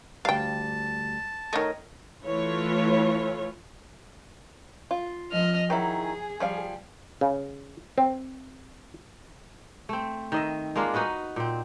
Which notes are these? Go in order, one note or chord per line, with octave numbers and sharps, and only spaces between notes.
D2 G3 F5 G5 A5
D#3 A3 A#4 C#5 D#5
E3 A3 F4 C#5
F4
F3 D#5 F6
D#3 F#3 E4 G#4
F3 G3 F5
C#3
C4
A3 C4
D#3 D#5 E5
G#3 A#3 D4 F4
D#4 F#4 B4 D#5
A#2 C4